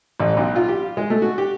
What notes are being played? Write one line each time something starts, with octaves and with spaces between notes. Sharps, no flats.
A1
B1
F4
G4
G#3
A3
F#4
G4